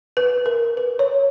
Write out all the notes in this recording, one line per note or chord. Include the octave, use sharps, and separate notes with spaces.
B4
A#4
B4
C#5